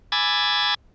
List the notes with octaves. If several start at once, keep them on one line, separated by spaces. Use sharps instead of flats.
G#5 B5 D6 E6 G#6 A6